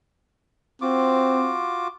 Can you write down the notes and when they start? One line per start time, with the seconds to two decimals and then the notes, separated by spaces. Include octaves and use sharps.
0.82 C4 F4 F#4 D6